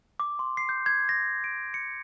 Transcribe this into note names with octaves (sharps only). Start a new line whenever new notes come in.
D6
C6
C7
G6
G#6
A#6
D7
C#7